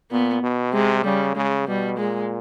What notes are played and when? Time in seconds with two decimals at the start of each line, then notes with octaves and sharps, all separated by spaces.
0.11 A#2 B3
0.43 B2
0.73 C3 G#3
1.05 C#3 G3
1.36 C#3 G#3
1.68 B2 G3
1.98 A#2 G#3